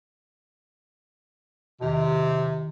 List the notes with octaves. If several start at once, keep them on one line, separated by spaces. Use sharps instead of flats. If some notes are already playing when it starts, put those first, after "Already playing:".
E2 C3 D#3 D#5